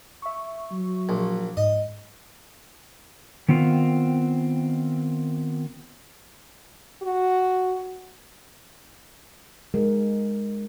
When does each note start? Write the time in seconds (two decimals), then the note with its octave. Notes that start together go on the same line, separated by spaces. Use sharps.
0.22 E5 C#6
0.71 F#3
1.09 A#1
1.57 G#2 D#5
3.49 D#3 B3 C4 F4
7.02 F#4
9.74 G#3 A#4